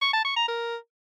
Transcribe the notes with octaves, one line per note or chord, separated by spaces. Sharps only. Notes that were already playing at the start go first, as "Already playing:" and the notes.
C#6
A5
C#6
A#5
A#4